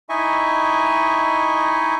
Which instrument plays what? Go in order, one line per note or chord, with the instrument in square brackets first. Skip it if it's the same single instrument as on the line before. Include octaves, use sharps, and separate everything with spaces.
[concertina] D#4 E4 D#5 E5 G#5 C#6